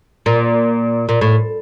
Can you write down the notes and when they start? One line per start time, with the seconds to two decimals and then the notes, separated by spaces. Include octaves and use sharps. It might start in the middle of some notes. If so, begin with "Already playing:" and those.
0.26 A#2
1.09 A#2
1.21 A2